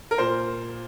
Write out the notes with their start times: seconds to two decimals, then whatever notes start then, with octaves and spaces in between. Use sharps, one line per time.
0.11 A#4
0.18 A#2 C5